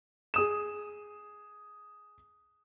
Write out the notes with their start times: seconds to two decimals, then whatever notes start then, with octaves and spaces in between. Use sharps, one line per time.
0.34 G#4 D#6 E7